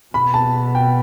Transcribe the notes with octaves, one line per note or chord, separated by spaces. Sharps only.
B2 B5
A5
G5